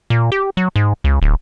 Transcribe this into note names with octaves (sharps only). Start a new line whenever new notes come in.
A#2
G4
F#3
G#2
C#2
D1